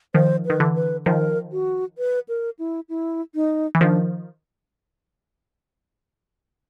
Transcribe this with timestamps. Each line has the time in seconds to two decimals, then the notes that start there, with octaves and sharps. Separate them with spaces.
0.14 D#3 F3 C5
0.45 D#3 B4
0.60 D3 E3
0.75 B4
1.06 D#3 F3 A#4
1.52 F#4
1.98 B4
2.29 A#4
2.59 E4
2.89 E4
3.35 D#4
3.75 E3
3.81 D#3 F3 D4